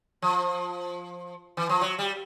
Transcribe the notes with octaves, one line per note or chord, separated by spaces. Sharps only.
F3
E3
F3
F#3
G3